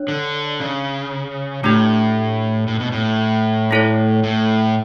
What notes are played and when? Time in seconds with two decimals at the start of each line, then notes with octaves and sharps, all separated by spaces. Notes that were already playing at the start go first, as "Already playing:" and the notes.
Already playing: D4 C#5
0.08 D3
0.60 C#3
1.64 A2 A3 D4 G4
2.68 A2
2.80 B2
2.92 A2
3.71 A3 E4 A4 C#5
4.23 A2